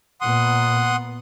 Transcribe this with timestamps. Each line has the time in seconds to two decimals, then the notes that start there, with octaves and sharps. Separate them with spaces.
0.21 A#2 B3 F#5 C6 D#6